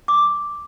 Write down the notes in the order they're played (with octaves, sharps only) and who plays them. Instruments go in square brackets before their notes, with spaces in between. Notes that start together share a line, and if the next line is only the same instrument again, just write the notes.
[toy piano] D6